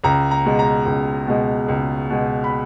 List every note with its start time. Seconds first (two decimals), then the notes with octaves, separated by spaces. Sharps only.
0.04 C#2 A#5
0.31 A#5
0.45 B2 G#3
0.59 A#5
0.86 C#2
1.27 B2 G#3
1.68 C#2
2.10 B2 G#3
2.44 B5